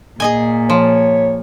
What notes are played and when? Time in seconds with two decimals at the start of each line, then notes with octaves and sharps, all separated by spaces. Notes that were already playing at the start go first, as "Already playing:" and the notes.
0.20 A#2 G#4 D#5 G#5
0.70 F3 C#5